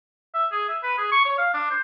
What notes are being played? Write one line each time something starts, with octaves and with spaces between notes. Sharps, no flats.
E5
G#4
E5
B4
G#4
C#6
C#5
F5
D4
C5